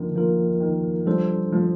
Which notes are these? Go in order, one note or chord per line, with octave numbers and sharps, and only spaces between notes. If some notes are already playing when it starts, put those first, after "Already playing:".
Already playing: D3 D#3 F3 A#3 F4 A#4
D3 F3 A#3 F4 A#4
D#3
F3 G3 D4 A4 C5
F3